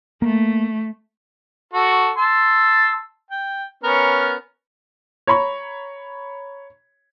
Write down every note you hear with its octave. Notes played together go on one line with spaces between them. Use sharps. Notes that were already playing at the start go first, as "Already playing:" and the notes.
A3 A#3
F#4 A4
A5 C6 E6
G5
B3 C#4 A#4
C#5 A#5 B5 C#6